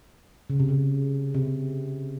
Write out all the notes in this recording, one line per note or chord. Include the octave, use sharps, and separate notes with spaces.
C#3
C3
C#3
C3